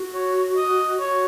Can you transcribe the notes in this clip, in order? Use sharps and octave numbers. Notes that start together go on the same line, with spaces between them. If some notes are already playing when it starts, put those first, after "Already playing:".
Already playing: F#4
C#5
D#5
F#4 C#5